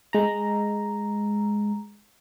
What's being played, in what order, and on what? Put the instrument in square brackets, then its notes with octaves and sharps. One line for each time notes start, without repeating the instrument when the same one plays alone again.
[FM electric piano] G#3 A#5